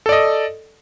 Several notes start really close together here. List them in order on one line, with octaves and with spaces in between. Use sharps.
A4 D5 D#5